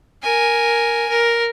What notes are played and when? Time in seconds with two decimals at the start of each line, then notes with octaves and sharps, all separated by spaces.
0.23 A#4 G#5
1.09 A#4